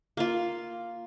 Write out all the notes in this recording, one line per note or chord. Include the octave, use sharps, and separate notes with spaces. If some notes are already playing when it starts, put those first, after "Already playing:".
A#3 F4